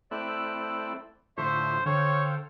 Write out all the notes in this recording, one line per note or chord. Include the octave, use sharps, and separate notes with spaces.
A3 C4 E4 D5 E6 F#6
A2 D3 F3 C5 E5 C#6
D3 A4 C5 C#5 F5 G5